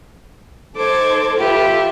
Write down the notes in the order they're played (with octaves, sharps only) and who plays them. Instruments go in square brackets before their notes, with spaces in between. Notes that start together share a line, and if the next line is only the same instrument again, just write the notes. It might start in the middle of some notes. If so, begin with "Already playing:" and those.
[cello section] D#4 A4 C5 [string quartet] D6 G#6
[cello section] F4 A4 B4 [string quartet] G4 E5